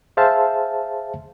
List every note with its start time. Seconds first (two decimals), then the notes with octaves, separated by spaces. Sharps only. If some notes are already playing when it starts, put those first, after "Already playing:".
0.17 G#4 C5 E5 F5 A5